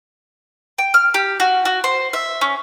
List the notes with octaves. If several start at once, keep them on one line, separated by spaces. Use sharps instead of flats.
G5
F6
G4
F#4
F#4
C5
E5
C#4